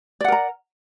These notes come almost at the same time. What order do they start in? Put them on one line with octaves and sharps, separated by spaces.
D5 F#5 A#4 A#5